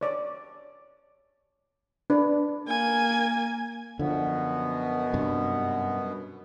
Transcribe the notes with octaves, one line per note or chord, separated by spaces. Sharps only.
C#5 D5
D4 B4
A#3 G#5
F#2 B2 D3 F3 B3
G2 C3